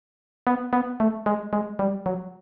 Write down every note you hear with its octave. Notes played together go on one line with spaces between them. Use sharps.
B3
B3
A3
G#3
G#3
G3
F#3